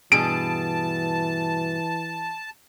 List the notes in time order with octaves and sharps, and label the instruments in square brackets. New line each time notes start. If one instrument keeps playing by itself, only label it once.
[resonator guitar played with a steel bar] G2 B2 G#4 [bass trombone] E3 [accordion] A5 [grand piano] D7